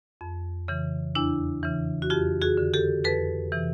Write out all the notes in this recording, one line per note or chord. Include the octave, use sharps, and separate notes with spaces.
F2
C#3 E3
E2 D4 E4
C#3 E3
F#4
F2 F4 G4
F#4 G#4
D3
G4 A4
F2 A4 B4
C3 E3